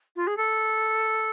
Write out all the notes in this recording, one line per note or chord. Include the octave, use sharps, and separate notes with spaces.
F4
G#4
A4